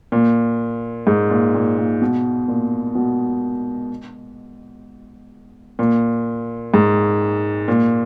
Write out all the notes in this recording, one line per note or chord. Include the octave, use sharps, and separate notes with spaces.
A#2
G#2
A#2
A#2
A#2
B2
A#2
B2
A#2
G#2
A#2